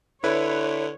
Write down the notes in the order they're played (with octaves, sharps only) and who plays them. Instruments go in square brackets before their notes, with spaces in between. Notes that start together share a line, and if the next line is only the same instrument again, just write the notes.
[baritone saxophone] D3 [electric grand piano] E4 B4 [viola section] C#5